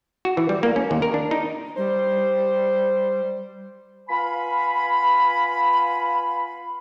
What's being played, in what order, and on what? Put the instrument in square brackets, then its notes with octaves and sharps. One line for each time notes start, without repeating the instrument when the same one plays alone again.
[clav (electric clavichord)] F#4
E3
G3
A#3
C#4
D#2
A#4
D4
D#4
[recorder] G3 [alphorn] C5
[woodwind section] B3 F4 F5 G#5 B5